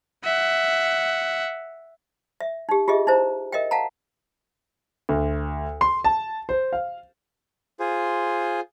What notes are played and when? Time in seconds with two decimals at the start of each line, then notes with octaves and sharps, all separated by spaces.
0.24 E5 F#5
2.40 E5
2.69 D#4 G4
2.88 F4 G4 G#4 D#5 E5
3.07 D#4 E4 C5 A#5
3.52 A#4 D#5 E5 G5
3.71 F5 F#5 A5 A#5
5.09 D2
5.81 C6
6.04 A5
6.49 C5
6.73 F5
7.80 F4 G#4 C5